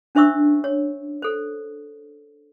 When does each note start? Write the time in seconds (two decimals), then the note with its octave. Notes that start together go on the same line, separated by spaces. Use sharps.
0.15 C#4 D4 C5 E5 C#6 E6
0.64 C#5
1.22 A4 C5